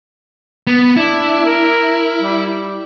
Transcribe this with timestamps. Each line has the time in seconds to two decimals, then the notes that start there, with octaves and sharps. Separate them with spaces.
0.67 B3
0.97 D4 E4
1.45 A#4
2.21 G3